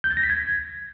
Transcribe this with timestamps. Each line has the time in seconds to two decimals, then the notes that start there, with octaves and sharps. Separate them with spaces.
0.04 G6
0.11 A6
0.17 A#6
0.23 B6
0.30 G#6